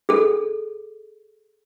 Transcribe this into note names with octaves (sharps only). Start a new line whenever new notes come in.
G#4 A4